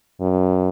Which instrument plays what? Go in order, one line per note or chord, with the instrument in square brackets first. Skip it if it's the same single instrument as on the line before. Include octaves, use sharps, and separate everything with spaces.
[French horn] F#2